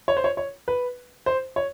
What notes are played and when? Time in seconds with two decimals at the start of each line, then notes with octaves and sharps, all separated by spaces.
0.08 C#5
0.17 C5
0.24 C#5
0.37 C#5
0.68 B4
1.26 C5
1.56 C#5